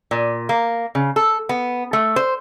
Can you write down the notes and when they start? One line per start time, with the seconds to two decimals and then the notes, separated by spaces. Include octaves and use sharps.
0.11 A#2
0.49 A#3
0.95 C#3
1.16 A4
1.49 B3
1.93 A3
2.16 C5